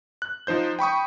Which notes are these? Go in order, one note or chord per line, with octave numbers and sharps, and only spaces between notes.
F#6
F3 D#4 C5 G6
G5 B5 C#6 D#6